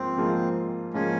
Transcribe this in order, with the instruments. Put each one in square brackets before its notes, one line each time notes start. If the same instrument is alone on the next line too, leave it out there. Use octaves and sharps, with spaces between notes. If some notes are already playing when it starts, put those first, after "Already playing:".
Already playing: [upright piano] G#2 F3 A#3 F4 [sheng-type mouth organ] C4
[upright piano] G#2 F3 A#3 F4 G#4
[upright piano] G#2 F3 A#3 F4 G#4 [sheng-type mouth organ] C#4